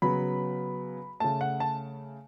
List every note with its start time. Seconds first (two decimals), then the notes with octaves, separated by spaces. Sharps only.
0.02 C#3 F#3 B3 B5
1.20 C#3 A3 A5
1.41 F#5
1.60 A5